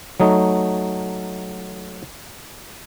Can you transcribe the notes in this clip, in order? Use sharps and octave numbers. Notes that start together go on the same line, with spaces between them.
F#3 A3 D#4